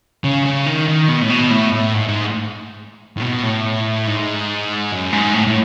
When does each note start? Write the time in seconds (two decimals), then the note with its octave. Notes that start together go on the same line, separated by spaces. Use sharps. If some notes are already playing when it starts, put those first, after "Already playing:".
0.24 C#3
0.46 C#3
0.66 D#3
0.88 D#3
1.09 B2
1.22 A2
1.30 B2
1.51 A2
1.72 A2
1.94 G#2
2.09 G#2
3.17 A2
3.21 B2
3.43 A2
4.07 G#2
4.92 F#2
5.13 G#2
5.34 A2
5.47 A2